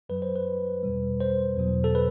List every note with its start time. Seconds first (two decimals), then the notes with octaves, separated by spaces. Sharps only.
0.09 F#2 F#3 B4
0.22 C5
0.35 B4
0.83 E2 B2 G3
1.20 C5
1.57 E2 B2 F#3
1.84 A4
1.95 B4